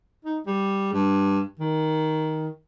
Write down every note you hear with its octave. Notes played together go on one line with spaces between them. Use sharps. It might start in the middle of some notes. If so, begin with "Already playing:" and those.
D#4
G3
G2
D#3